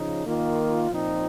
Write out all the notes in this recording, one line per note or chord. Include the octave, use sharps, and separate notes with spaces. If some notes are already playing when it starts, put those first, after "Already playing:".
Already playing: C#3 F3 D#4
D#3 A#3 F4
A#2 F3 C4 D#4